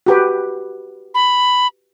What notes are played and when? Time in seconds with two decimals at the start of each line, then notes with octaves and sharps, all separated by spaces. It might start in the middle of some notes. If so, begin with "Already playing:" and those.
0.06 F#4 G4 B4
1.15 B5